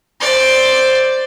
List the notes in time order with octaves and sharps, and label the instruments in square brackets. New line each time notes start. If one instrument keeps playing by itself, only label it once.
[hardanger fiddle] C5 D5